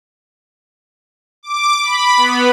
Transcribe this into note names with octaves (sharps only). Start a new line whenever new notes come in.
D6
B5
B3